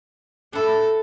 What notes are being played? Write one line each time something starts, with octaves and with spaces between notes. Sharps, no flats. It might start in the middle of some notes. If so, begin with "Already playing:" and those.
D4 E4 A4